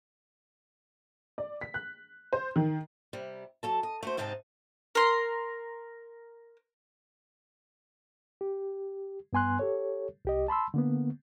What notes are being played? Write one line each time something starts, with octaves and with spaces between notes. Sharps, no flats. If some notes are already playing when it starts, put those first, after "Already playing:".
D5
B6
F#6
C5
D#3
C3 G3
F#3 A4 A5
D#5
A3 F#4 C5
G#2 C3 C4 D#4 F4 A5
A#4 C6
G4
G2 B3 G#5 C6 F#6
G4 A4 C#5
C2 G4 D#5
A5 B5 C6 E6
D3 A#3 B3